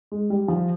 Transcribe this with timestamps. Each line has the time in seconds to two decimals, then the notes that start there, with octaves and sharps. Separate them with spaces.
0.12 G#3
0.30 G3
0.48 F3